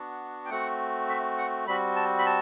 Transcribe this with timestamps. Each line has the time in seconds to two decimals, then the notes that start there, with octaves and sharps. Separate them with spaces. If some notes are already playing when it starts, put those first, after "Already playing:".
Already playing: B3 D4 F#4
0.45 G5
0.50 A3 C4 F#4 F#5
1.09 E5
1.38 F#5
1.67 G3 C4 F#4 B5
1.96 A5
2.19 B5
2.26 A5